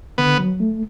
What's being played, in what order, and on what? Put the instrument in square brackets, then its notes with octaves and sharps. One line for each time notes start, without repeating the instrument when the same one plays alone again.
[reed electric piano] D3 [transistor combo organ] B3
[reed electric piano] F#3
A3